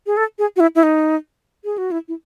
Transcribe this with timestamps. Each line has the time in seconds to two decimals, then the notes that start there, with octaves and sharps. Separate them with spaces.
0.07 G#4
0.17 A4
0.39 G#4
0.56 F#4
0.60 E4
0.75 E4
0.83 D#4
1.65 G#4
1.78 F#4
1.91 E4
2.08 E4